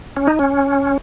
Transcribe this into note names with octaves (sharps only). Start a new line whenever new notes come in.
C#4
D#4
C#4